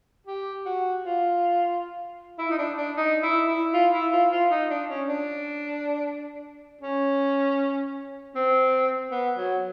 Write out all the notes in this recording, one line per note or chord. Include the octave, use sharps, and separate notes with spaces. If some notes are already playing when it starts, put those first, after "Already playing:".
G4
F#4
F4
E4
D#4
D4
D4
D#4
E4
E4
F4
E4
F4
F4
D#4
D4
C#4
D4
C#4
C4
B3
F#3